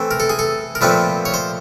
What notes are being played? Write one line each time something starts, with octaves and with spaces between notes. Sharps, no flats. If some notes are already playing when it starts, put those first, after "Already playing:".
Already playing: E3 A3 C4
A#4
A4
G#4
A4
A#4
A#2 F3 A3 C4 B4
C#5
C5